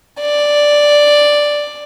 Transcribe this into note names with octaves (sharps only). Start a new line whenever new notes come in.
D5